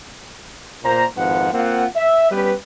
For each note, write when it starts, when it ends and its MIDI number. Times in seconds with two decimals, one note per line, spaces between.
0.83 1.05 46
0.83 1.05 72
0.83 1.05 82
1.17 1.52 32
1.17 1.52 41
1.17 1.52 51
1.17 1.52 53
1.17 1.52 71
1.17 1.52 78
1.53 1.85 58
1.53 1.85 60
1.53 1.85 65
1.53 1.85 78
1.96 2.28 76
2.31 2.53 55
2.31 2.53 59
2.31 2.53 61
2.31 2.53 67
2.31 2.53 71